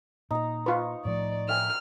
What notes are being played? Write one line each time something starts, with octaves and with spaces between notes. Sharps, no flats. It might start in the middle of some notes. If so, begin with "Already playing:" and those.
A#2 D#4 A#5
F4 B4 C#6
A2 F3 A3 D5
E5 G5 G#5 F6